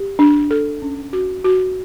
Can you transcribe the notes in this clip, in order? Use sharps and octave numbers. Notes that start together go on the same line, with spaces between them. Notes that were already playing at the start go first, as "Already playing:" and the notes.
Already playing: G4
D4
A4
C#4
F#4
F#4